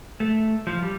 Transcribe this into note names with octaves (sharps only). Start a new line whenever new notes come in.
A3
F3
G3